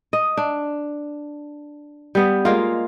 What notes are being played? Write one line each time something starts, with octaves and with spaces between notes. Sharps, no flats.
D#5
D4
G3 B3
G#3 A#3 F4